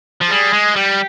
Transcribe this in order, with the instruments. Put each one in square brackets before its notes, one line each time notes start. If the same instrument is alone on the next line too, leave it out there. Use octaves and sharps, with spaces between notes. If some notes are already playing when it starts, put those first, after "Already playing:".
[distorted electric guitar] F3
[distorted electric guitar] G3 [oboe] G#4
[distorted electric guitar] G#3
[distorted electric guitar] G3 [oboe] G4